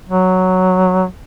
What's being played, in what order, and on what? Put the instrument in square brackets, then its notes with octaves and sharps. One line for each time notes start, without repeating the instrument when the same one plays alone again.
[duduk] F#3